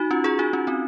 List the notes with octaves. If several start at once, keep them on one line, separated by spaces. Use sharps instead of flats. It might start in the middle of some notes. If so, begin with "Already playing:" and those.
Already playing: D#4 F#4
C#4 F4
F4 G#4
D#4 F#4
C#4 F4
C4 D#4